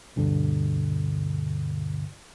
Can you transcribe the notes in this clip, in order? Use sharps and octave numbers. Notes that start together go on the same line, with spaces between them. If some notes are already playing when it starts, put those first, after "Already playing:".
D2 G2 B2 D3